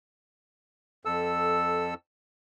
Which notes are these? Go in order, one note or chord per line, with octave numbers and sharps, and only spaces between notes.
F2 A4 E6